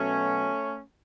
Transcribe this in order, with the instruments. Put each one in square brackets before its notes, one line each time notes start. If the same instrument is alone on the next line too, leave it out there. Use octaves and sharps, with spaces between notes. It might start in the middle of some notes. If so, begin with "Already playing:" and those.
Already playing: [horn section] B2 F#3 A3 C#4